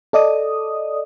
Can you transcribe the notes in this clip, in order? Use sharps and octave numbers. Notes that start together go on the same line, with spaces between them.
A4 D5 D#5 D#6